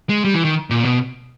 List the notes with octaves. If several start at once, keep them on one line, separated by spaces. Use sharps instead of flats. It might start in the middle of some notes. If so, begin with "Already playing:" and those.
G#3
G3
E3
D#3
A#2
B2